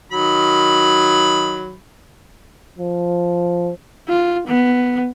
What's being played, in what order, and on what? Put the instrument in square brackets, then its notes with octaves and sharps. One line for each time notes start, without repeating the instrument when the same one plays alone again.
[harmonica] D#3 F#3 B5
[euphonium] F3
[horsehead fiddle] F4
B3